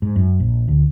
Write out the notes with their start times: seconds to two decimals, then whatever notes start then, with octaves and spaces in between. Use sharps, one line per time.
0.02 G#2
0.16 F#2
0.40 A#1
0.68 D2